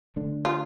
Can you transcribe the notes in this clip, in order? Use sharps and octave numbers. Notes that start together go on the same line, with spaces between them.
D3 A3 D4
F4